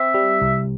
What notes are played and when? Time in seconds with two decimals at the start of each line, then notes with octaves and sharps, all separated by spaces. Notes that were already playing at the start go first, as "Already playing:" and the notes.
Already playing: C4 E5
0.14 G3
0.41 C2